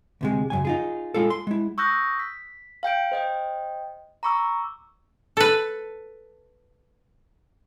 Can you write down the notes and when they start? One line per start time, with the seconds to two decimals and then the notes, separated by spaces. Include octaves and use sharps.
0.21 D2 C3 G#3
0.50 F#2 C#3 G#5
0.65 D#4 F4 G#4
1.14 G#3 F4 A4
1.30 C6
1.47 G#3 E4
1.78 C#6 D#6 E6 F#6 G6 A#6
2.19 B6
2.83 F5 G5 G6 D7
3.12 C5 D#5 G5
4.23 A#5 B5 C#6 D6 E6
5.37 A4 B4